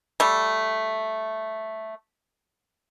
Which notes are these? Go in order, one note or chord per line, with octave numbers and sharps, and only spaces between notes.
G3 A3